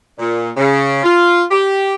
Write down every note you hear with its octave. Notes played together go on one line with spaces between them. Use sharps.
A#2
C#3
F4
G4